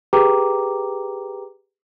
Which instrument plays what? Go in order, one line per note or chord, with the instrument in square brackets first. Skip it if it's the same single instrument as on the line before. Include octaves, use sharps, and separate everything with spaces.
[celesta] G4 G#4 B4 G5 A#5 D6